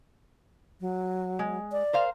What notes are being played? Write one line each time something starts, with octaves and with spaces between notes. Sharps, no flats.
F#3
G#3
D5
A#4 C5 F5